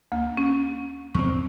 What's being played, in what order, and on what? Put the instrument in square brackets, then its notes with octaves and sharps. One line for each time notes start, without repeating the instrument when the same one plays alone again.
[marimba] D2 A#3
C#4
[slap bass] E2 C4 [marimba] C#6